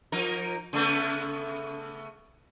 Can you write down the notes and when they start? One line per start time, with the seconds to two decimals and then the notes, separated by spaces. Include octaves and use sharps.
0.12 F3 D#4 A#4
0.73 C#3 A3 B3